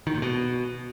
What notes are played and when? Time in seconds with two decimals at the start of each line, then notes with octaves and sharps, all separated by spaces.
0.07 D#3
0.14 A#2
0.22 B2